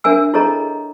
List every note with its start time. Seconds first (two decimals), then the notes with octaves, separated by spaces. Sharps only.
0.04 D4 A#4 E5 G#5 E6
0.34 E4 G#4 A4 C#5 D#5 A#5